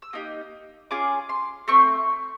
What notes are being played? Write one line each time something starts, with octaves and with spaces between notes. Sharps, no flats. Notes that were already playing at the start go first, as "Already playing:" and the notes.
E6
A#3 D#4 G4 D#6
C#4 F4 G#4 D6
C6
A3 C4 C#6